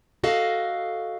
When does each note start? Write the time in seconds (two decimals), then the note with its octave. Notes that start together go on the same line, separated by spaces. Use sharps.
0.24 F#4 A4 D#5 F5